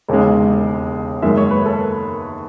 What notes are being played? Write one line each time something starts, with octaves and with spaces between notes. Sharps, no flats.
E1 D#2 C#3 G#3
F#1 F#2 D#3 G#3 E5
C#5
B4
A4